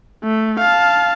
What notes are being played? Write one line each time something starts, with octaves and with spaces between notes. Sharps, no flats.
A3
F5 A5